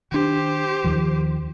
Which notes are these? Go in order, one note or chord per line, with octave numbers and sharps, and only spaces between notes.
D#3 D4 G4 C5
D#2 D#3 F3